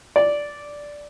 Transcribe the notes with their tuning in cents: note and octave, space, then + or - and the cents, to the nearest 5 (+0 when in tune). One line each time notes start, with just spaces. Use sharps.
D5 -5